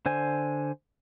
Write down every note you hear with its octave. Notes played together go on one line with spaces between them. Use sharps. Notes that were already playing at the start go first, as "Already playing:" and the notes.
D3 C5 G#5